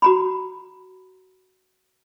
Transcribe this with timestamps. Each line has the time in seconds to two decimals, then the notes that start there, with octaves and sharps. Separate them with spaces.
0.02 F#4 A#5 B5